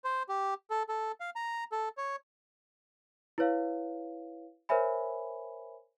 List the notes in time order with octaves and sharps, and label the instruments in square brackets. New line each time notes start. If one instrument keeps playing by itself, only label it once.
[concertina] C5
G4
A4
A4
F5
A#5
A4
C#5
[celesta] E4 B4 C#5 F5
A#4 C5 C#5 E5 G#5 B5